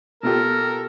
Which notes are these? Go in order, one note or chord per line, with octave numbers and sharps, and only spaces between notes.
B2 F4 G4 A4 A#4